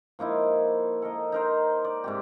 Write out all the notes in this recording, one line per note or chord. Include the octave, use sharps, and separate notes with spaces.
F3 A#3 D#4 E4
A4 A#4 D#5
D#4 A#4 C5
D5
G#2 C3 G4